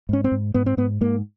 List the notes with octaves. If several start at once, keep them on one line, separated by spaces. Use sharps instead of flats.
G#2 C#4
C4
G#2
G#2 B3
C4
G#2 B3
G#2 A#3